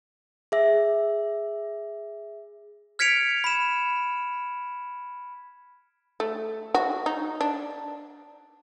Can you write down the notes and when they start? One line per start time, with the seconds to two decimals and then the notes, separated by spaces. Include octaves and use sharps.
0.52 G#4 E5
2.99 F6 G#6 B6 C#7 D7 F7
3.44 B5 E7
6.20 A3
6.75 F#4
7.06 D#4
7.41 D4